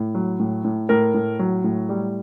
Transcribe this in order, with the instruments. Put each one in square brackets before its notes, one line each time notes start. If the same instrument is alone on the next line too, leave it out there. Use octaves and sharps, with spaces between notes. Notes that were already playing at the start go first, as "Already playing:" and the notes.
Already playing: [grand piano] A2
F#3
A2
A2
A2 A#4
A2
F#3
A2
G3